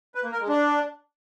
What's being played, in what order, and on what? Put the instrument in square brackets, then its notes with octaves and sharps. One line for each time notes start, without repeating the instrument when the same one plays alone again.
[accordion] B4
A#3
A#4
G#3
D4